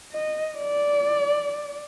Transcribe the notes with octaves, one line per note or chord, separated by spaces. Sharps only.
D#5
D5